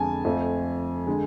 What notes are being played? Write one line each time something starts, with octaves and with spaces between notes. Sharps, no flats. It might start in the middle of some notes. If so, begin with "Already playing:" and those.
Already playing: F2 D3 G#3 G#5 A5
F2 F3 A3
D3 G#3